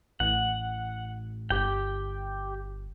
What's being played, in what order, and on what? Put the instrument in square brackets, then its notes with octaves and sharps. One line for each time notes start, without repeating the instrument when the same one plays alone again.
[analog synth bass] A1 [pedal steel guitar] F#5
[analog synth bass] G1 [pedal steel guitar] G4 G5